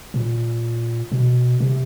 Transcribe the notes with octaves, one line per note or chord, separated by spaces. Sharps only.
A#2
B2
C3